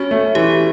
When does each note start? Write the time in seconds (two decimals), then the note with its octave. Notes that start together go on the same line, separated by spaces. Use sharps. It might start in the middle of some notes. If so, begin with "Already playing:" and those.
Already playing: C#4 F#4
0.11 A3
0.35 E3 G4